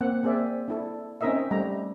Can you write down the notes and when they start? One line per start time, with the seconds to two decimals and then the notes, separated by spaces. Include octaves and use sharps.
0.01 A#3 C4 F#5
0.23 A#3 C4 G#4 D5 E5
0.68 D4 E4 A4
1.21 C4 C#4 D#4 A#4 D#5 E5
1.51 G3 A3 A#5